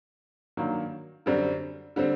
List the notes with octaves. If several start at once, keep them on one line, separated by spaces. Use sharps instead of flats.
G2 D#3 F#3 A#3
F#2 D3 G3 C4
D3 G3 C4